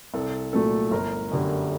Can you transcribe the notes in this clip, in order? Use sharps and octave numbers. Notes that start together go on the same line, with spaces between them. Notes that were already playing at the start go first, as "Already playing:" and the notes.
C2 A4
A#2 F#3 A3 A4
G1 A#4
F#2 D3 G3